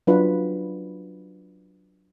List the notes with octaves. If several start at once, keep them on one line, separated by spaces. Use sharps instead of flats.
F#3 D4 F4 B4